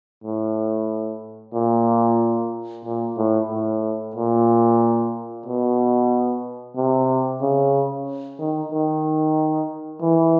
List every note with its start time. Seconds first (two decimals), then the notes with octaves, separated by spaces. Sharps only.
0.24 A2
1.54 A#2
2.85 A#2
3.17 A2
3.50 A2
4.16 A#2
5.46 B2
6.76 C3
7.42 C#3
8.39 D#3
8.72 D#3
10.02 E3